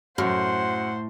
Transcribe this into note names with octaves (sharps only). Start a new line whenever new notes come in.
F#2 A2 C5 F#5